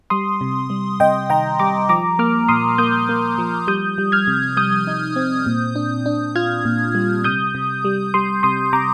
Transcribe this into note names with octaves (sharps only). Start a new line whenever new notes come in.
G3 C6 D#6
C3
G3
C3 D#5 G5
D#3 G5 A#5
G3 A#5 D6
F3 A#5 D6
A#3 D6 F6
A#2 C6 D#6
A#3 D#6 G6
A#3
F3
G3 D#6 G6
G3
F6 G#6
C3
G3 D#6 G6
D#4
C4
A#2
D4
D4
F4 F6 G#6
A#2
G3
C3 D#6 G6
C3
G3
G3 C6 D#6
C3 C6 D#6
C3 A#5 D6